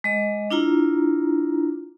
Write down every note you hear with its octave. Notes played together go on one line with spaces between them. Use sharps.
G#3 D#5
D4 E4 F4 A#5